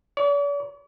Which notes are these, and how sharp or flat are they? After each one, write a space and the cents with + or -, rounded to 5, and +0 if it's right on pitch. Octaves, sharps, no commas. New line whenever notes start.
D5 -45